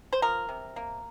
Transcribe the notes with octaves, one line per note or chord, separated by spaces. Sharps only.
C5
F3 A#4
C3
A#3